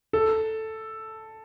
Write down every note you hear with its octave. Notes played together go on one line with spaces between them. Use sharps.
A4